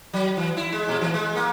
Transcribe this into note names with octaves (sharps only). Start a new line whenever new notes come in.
F#3
E3
E4
G#3
A#2
E3
G#3
A#3